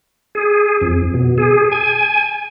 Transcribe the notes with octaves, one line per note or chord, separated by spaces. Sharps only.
G#4
F2
B2
G#4
G#5